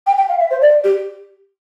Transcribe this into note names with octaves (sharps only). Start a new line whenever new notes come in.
G5
G5
F5
E5
C5
D5
G4